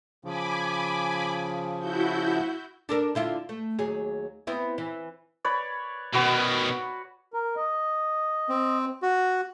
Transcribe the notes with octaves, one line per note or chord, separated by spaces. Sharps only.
C#3 F3 G#5 B5 D6
E4 F#4 G6
D4 A4 A#4
D3 E4 F4
A3
D#2 F#3 G#4
B3 C4 E4
E3
B4 C#5 D5
B2 D#3 F#4 B4
A#4
D#5
C4
F#4